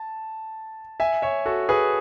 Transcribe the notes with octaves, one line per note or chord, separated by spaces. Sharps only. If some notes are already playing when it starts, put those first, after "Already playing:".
Already playing: A5
E5 G#5
C#5 E5
F#4 A4
G#4 B4